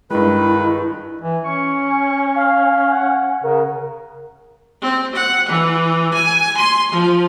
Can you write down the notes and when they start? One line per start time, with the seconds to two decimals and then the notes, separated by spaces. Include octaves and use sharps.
0.10 G2 D#3 G#3 E4 B4
1.22 E3
1.44 C#4 C#6
2.36 F5
2.92 F#5
3.44 C#3 A#4
4.82 C4
5.15 F#5
5.49 E3
6.13 G#5
6.57 C6
6.92 F3